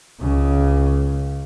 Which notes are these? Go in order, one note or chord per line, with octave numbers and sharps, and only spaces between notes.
C#2 C#3